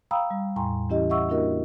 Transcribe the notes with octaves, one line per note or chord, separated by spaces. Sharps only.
F5 G5 A#5 B5 D#6 E6
G3
E2 A2 G5 G#5 A#5 C6
E3 C#4 E4 G4 D#5
D#5 E5 F#5 C#6 E6
A#3 D4 E4 F#4 A#4 D#5